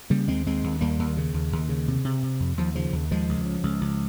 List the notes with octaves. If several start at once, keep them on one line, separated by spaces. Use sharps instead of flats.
C#3 G3 A#3
D#2 G#3 C4
D#2 G#3 C4
D#2
D#2 G3 A#3
D#2
C#3
D#2
D#2
C#3
C3
C3
C3
F2
D#2 F3
C#3 F3
D#2
D#2 F3 G#3
C#2
C#3
C#2
C#2